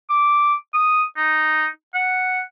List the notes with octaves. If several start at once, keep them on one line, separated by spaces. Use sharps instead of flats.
D6
D#6
D#4
F#5